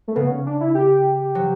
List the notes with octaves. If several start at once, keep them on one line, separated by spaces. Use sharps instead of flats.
A3
C#3 B3
C#4
D4
E4
G4
F#3